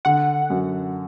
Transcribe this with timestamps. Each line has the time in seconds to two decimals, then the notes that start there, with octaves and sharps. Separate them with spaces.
0.05 D3 F#5
0.50 F#2